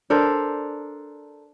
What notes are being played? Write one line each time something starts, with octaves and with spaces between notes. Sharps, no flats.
D4 A4 A#4 C5